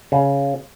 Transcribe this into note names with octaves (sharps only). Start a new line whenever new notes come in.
C#3